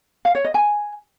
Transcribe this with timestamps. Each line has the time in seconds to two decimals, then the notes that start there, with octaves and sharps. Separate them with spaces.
0.25 F5
0.35 C#5
0.44 D#5
0.54 G#5